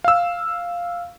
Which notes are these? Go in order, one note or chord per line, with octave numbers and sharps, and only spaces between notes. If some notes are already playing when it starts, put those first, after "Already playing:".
F5 E6